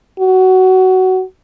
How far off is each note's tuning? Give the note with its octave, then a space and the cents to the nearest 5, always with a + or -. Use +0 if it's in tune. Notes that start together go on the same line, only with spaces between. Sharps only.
F#4 +15